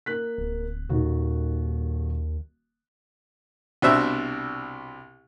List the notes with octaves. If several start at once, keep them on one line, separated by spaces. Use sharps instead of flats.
A#3 F#6 B6
D1
D#1 D#2 D#3 F#4
C2 B2 C4 D4 E5 F#6